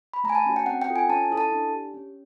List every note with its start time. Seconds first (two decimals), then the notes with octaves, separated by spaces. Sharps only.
0.14 B5
0.24 A3 A#5
0.29 G#5
0.35 A5
0.46 C#4 F#4
0.56 G5
0.66 C4 F#5
0.82 G5
0.89 F4 A4
0.96 G#5
1.09 C#4 A5
1.31 E4 A4
1.37 A5
1.52 D4
1.73 G4
1.94 C#4